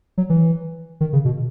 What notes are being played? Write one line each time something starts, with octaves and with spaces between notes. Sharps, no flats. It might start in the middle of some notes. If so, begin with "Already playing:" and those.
F#3
E3
D#3
C#3
B2